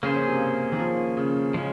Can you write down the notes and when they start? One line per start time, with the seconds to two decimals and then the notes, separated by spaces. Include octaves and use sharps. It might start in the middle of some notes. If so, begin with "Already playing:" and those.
0.03 C#3 A#3 C#4 G#4 C5
0.16 C#3
0.28 C3
0.72 D#3
0.79 F3
1.17 C#3
1.54 C#3 F3 G#3 C#4